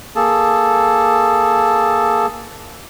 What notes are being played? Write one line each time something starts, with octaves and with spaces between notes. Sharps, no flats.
A#3 G#4 A4 A5